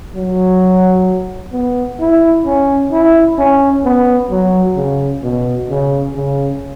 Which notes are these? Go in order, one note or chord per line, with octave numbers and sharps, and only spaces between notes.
F#3
B3
E4
C#4
E4
C#4
B3
F#3
C#3
B2
C#3
C#3